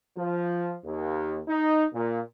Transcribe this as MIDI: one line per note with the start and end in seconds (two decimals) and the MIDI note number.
0.17 0.75 53
0.84 1.39 39
1.48 1.84 63
1.93 2.19 46